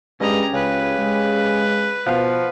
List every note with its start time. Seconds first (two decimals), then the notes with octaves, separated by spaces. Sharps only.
0.20 G2 G#3 C#4 G4 D#5 A#5
0.53 C#2 C#3 B4
0.98 G#3
2.07 B2 F3 B3 F5 F#5